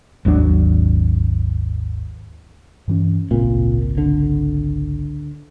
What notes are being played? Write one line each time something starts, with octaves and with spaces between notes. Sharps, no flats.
G#1 D#2 F#3 D4
G2 E3 C#4
G#1 C#2 A#2 C4
D3